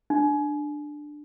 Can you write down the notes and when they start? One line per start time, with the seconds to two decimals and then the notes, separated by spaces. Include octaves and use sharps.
0.10 D4